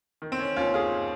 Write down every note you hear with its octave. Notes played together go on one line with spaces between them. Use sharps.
D#3
C4
C#4
D#2 C#4 F4
F4 G#4